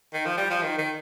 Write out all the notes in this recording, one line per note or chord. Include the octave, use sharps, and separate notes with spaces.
D#3
F3
G3
F3
D#3
D#3